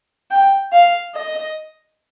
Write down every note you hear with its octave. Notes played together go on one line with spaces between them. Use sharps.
G5
F5
D#5